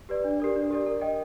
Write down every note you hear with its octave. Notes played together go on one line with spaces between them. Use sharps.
G4 B4 D5
D4
G4 A#4 D5
D4
G4 A#4 D5
A#4
D#5 G5